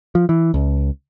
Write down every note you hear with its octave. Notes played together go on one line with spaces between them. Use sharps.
F3
E3
C#2